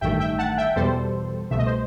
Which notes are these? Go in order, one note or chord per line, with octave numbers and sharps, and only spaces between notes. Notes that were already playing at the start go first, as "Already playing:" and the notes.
A1 G2 D#3 A3 E5 G5
E5 G5
F#5 A5
E5 G5
E2 B2 G3 A4 C5
C2 B2 A3 E5
D#5
C5